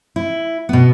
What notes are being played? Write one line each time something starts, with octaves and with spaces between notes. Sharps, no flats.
E4
B2 B3